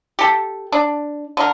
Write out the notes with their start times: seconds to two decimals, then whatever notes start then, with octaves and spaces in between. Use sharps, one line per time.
0.19 G4 A4
0.72 D4
1.37 D3 A#4